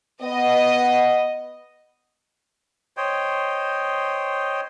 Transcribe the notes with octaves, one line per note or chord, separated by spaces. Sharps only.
B3 D#5
C5 C#5 D#5 G5